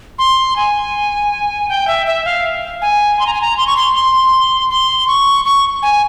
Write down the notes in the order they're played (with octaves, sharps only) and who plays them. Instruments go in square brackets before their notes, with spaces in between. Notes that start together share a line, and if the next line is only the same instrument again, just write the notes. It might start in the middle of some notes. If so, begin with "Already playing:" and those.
[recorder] C6
G#5
G5
E5
E5
F5
G#5
C6
A#5
G#5
A#5
C6
C#6
C6
C6
C6
C#6
C#6
G#5